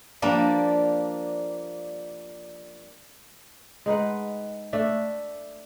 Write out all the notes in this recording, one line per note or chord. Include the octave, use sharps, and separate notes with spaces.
F3 G3 A#3 D4
G#3 D#4 B4 F#5
A3 D4 E5